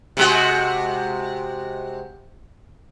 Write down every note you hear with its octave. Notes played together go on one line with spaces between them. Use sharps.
C3 G#3 F#4